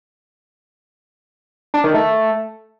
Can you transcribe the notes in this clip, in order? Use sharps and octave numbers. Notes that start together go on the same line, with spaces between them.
D4
D#3
A3